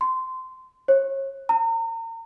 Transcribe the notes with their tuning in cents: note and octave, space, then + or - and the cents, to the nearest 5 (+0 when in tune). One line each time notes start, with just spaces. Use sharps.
C6 -15
C#5 -35
A#5 -35